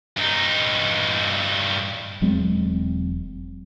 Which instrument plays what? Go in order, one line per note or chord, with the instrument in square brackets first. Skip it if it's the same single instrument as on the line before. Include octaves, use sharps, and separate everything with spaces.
[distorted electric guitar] G2 D#4
[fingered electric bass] E1 F#3 G#3 C4